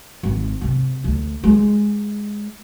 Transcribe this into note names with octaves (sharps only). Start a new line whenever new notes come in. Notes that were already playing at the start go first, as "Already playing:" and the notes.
G#1
C3
D2
G#3